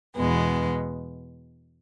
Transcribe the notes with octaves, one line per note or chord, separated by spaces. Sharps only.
E2 B2 G#3 B3